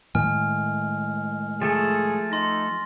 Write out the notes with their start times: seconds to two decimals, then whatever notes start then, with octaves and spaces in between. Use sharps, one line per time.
0.15 A2 D#3 G#3 G#5 F6
1.62 F3 A3 G#4 A4 A6
2.32 D#4 C6 A#6